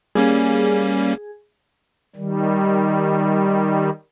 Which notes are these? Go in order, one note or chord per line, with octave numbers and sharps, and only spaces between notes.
G3 A#3 C#4 G#4
D#3 G3